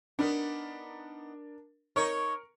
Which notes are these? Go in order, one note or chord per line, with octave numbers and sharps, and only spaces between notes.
B3 D4 D#4 A#4
D#4 A#4 C#5 C#6